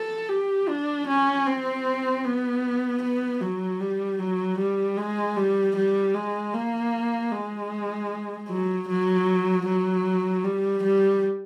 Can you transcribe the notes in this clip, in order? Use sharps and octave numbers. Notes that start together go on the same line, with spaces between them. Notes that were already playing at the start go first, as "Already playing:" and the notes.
Already playing: A4
G4
D4
C#4
C4
B3
B3
F#3
G3
F#3
G3
G#3
G3
G3
G#3
A#3
G#3
F#3
F#3
F#3
G3
G3